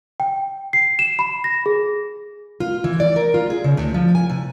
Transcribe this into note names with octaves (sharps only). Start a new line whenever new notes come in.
G5
C7
E7
B5
A#6
G#4
F4
E3
D5
A#4
F4
G#4
C#3
D2
F3
G#5
C3